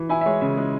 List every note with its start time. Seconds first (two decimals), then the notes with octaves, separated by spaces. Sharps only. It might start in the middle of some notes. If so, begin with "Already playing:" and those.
Already playing: E3
0.09 E4 G#5
0.21 E5
0.26 G#3 C#5
0.41 C#3 E5
0.57 G#3